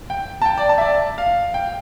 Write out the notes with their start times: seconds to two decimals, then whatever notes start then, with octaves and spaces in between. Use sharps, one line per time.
0.10 G5
0.42 A5
0.46 G5
0.58 D5
0.69 A5
0.78 E5
0.81 D5
1.18 F5
1.54 G5